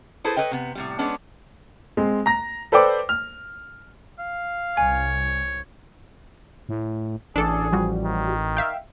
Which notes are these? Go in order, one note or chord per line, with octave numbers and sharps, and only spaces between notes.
E4 G#4 A4 B4 C5
A4 B4 C#5 D#5 G5
C3 B3
A2 C3 G3
G#3 B3 C#4 D4
G#3 C4
A#5 A#6
A4 B4 C5 D5 G5 D6
F6
F5
C2 C#5 G#5
A2
A1 D4 G#4 A4 D5
F3 G3 F#4
D#3
E5 F5 G5